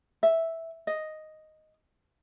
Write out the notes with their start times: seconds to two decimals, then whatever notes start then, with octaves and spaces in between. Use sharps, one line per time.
0.23 E5
0.87 D#5